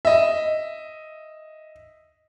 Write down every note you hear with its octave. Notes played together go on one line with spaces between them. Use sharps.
D#5 E5